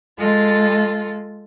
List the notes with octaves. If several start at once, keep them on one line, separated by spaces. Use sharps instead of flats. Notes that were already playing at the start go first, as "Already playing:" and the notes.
G#3 F4 A4